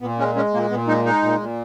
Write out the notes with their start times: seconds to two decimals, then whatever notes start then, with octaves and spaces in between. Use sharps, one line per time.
0.01 A#2 B3
0.18 G#3 C#4
0.35 G#3 C#4
0.53 A#2 A#3
0.70 A#2 B3
0.87 G#3 D#4
1.05 G#3 D#4
1.22 A#2
1.40 A#2